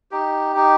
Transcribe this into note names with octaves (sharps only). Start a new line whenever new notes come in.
D#4 G4
D#4